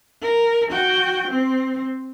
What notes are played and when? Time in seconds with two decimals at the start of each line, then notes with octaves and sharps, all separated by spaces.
0.22 A#4
0.72 F#4 G5
1.28 C4